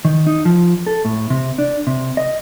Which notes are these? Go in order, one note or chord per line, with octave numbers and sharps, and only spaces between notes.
D#3
D#4
F3
A4
A2
C3
D4
C3
D#5